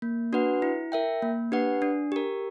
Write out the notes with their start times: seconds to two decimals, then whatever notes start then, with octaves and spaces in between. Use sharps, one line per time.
0.02 A#3
0.33 D4 F#4 B4 F#5
0.62 E4
0.92 A#4 E5 G5
1.22 A#3
1.52 D4 G4 B4 F#5
1.82 D4
2.12 G4 A#4